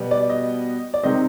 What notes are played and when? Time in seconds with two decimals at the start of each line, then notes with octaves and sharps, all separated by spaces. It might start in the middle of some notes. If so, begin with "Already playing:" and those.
Already playing: B2 G3 B3
0.11 D5
0.30 D#5
0.94 D5
1.03 C3 D#3 G#3 C4 D#5